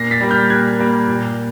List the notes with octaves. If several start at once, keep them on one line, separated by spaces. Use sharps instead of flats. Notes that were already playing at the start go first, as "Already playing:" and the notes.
Already playing: A#2 A#6 C7
A6 B6
G3 A#3
F6 G6
A#2 F#6 G#6
G3 A#3
A#2